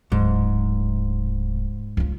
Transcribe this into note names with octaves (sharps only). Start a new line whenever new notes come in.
D1 G#2
C#2 F4